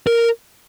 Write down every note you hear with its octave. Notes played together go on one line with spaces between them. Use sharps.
A#4